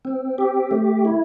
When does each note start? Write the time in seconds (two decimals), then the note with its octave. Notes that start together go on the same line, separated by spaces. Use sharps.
0.05 C4
0.38 G4
0.71 A3
1.05 E4